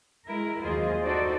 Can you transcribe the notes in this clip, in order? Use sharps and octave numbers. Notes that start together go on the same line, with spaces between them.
G#3 E4 A#4
D#2 F#3 F4 G#4 C5 D#5
D#4 F#4 A4 C5 D5